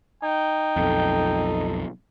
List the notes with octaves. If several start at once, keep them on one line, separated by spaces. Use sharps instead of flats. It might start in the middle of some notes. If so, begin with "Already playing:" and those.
D#4 G5
B1 F2 A4